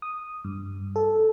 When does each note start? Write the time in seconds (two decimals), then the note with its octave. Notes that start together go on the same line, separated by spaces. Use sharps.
0.02 D#6
0.44 G2
0.96 A4